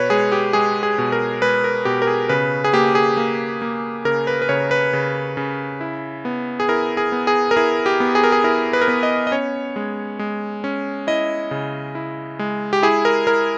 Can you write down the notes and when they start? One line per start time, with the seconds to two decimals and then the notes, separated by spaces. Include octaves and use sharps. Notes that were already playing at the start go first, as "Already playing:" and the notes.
Already playing: B2 B4 C#5
0.10 G#3 G#4
0.32 G4
0.53 G#3 G#4
0.83 G#4
0.98 B2
1.12 A#4
1.42 G#3 B4
1.64 A#4
1.85 B2 G4
2.02 A#4
2.07 G#4
2.29 C#3 B4
2.64 G#4
2.73 A#3 G4
2.95 G#4
3.17 A#3
3.62 A#3
4.05 C#3 A#4
4.27 B4
4.42 B4
4.49 C#3 C#5
4.71 B4
4.93 C#3
5.37 C#3
5.81 E4
6.25 B3
6.60 G#4
6.69 E4 A#4
6.97 G#4
7.12 B3
7.27 G#4
7.51 A#4
7.56 E4 G#4
7.86 G4
8.00 B3
8.15 G#4
8.24 A#4
8.32 G#4
8.44 E4 A#4
8.73 B4
8.81 A#4
8.88 B3 B4
9.03 D#5
9.27 D#5
9.32 C#4 C#5
9.76 G#3
10.19 G#3
10.64 C#4
11.07 E4 D#5
11.51 C#3
11.95 E4
12.39 G#3
12.73 G4
12.83 E4 G#4
13.05 A#4
13.27 E4 A#4